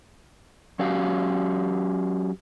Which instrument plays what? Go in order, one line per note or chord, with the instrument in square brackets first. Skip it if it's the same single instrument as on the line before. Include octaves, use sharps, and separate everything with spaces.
[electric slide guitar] F#3 C#4 F#4 G4 F5